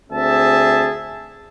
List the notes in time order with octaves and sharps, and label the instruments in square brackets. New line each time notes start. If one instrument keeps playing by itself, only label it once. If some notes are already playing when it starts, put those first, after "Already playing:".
[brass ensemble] D2 C4 G#4 E5 A5